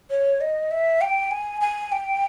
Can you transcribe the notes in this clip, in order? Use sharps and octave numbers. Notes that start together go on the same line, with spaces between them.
C#5
D#5
E5
G5
G#5
G#5
G5